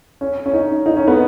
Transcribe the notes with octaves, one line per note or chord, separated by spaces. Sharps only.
C#4
C#4
D#4
D#4
C#4
B3